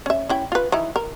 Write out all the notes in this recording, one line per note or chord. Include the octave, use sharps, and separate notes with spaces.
C#4 E5
C#4 E4 G5
F4 B4
E3 D#4 E4
A#4